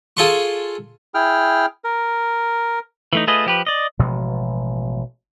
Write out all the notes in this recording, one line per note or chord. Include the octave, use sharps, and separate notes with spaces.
F4 G#4 A4 A5 C6 C#6
E4 G#4 G5 F6
A#4
E3 A3 D#4
A3 F4 G#4 B4 D#5
F3 G4 B4
D5 D#5
A1 B2 F3 G#3